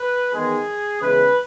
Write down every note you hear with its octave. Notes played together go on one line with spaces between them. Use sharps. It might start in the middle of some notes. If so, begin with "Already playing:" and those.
Already playing: B4
E2 D#3 G#3 G#4
E2 C#3 E3 G#3 B4